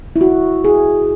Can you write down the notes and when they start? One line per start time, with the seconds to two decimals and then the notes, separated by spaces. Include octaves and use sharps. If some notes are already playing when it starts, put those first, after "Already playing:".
0.16 E4
0.21 F#4
0.64 G#4